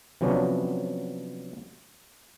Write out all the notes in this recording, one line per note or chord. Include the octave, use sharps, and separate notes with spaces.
C3 F3 F#3 B3 C#4 D4